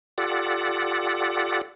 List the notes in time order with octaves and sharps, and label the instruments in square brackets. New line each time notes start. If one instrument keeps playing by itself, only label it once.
[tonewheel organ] F4 G4 A4 D5 F#5